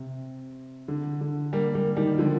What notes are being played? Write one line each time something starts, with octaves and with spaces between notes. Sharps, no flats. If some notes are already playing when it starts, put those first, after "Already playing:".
Already playing: C3
D3
D3
G3 A#3
G3 A#3
D#3 G3
D3 F3